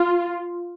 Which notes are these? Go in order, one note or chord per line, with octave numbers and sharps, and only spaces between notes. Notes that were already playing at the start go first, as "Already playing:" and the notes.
Already playing: F4